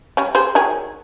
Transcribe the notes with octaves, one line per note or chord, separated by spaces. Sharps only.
G3 C#4
G4 G#4 C5
D#3 F#3 G#4